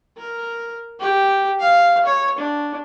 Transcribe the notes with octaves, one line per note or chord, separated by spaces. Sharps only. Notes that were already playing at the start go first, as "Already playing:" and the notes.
A#4
G4
F5
C#5
D4